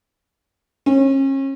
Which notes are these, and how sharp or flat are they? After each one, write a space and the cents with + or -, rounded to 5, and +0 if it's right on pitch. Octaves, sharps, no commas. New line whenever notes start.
C#4 -35